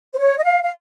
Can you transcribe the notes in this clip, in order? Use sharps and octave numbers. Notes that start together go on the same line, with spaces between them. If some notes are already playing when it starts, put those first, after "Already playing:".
C5
C#5
D#5
F5
F5